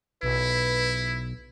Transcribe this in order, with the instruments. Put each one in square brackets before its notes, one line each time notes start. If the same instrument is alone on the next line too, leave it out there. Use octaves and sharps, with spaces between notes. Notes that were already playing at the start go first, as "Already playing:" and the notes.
[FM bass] B1 [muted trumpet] E4 [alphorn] B4